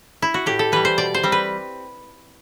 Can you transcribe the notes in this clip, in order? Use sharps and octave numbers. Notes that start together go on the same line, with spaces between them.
E4
F#4
A2 G4
A4
E3 G3 B4
C5
B2 D5
C5
G3 C4
B4